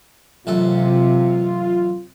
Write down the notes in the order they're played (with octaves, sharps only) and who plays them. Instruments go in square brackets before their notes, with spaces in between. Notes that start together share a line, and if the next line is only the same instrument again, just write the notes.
[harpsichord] A1 F#2 A4 [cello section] C3 [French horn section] F4